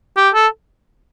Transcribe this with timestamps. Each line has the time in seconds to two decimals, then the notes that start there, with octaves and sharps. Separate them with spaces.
0.17 G4
0.34 A4